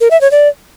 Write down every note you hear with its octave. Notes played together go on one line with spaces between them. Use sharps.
A#4
E5
C#5
D5